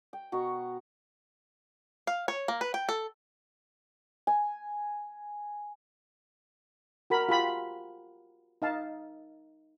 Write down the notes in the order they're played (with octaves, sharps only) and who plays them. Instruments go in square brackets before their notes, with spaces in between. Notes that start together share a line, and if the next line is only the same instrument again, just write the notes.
[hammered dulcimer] G5
B2 F#4 A#5 C#6
[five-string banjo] F5
C#5
A#3
B4
G5
A4
[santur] G#5
[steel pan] F#4 A#4 B5
F4 G4 B5
D#4 F5 A5